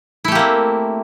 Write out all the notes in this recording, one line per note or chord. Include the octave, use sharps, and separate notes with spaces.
A3 A#3 C4 E4 G4